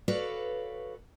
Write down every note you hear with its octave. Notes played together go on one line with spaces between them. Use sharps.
F#4 A4 B4 C#5 D5 F5